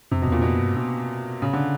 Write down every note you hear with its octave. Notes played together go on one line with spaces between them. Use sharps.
F2 C3
B2
E2 A#2
F2 B2
G2
B2
C#3
D3